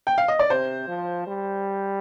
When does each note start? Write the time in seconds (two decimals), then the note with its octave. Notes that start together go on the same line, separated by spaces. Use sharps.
0.07 G5
0.18 F5
0.28 D#5
0.39 D5
0.50 C3 C5
0.88 F3
1.27 G3